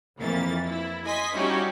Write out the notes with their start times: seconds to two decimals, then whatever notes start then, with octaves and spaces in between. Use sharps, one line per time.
0.19 F2 E3 A#3 A6
0.69 E4
1.05 D#5 G#5 C6 B6
1.35 G3 C#4 D#4 E4 F#4 G4